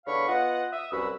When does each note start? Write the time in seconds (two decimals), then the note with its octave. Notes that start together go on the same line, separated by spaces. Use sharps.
0.06 E2 D3 C#5 F5 B5 C#6
0.27 B3 F4 D#5 F#5
0.73 E5 D#6
0.91 C2 F#2 F#4 B4 B5 E6